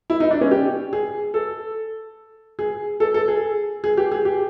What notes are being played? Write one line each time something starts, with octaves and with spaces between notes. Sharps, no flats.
E4
D#4
D4
C#4
G4
G#4
A4
G#4
A4
A4
G#4
G#4
G4
G#4
G4